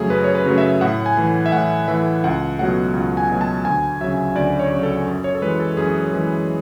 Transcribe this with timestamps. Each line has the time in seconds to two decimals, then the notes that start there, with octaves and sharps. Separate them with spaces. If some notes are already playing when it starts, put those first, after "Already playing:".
Already playing: F#2 C#3 F#3 A3 G#4
0.10 F#2 B4
0.24 C#5
0.35 B4
0.46 C#3 F#3 A3
0.58 E5
0.81 A2 F#5
1.06 G#5
1.17 E3 A3
1.46 E5
1.52 A2 F#5
1.88 E3 A3 E5
2.24 C#2 F#5
2.58 B2 F#3 A3 F#5
2.94 C#2
3.17 G#5
3.30 B2 F#3 A3
3.41 A5
3.64 D2 G#5
4.01 C#3 F#3 E5
4.35 D2 D5
4.59 C#5
4.71 C#3 F#3
4.83 A4
5.07 F#2
5.24 C#5
5.35 A4
5.42 E3 G#3 B4
5.60 A4
5.77 F#2 G#4
6.13 E3 G#3